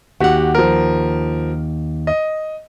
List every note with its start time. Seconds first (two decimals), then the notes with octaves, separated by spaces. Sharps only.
0.20 D#2 F#4 G4 F#5
0.55 F3 A#4
2.07 D#5